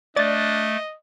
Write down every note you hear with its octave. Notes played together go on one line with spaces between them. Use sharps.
A3 D4 D5 D#5 A6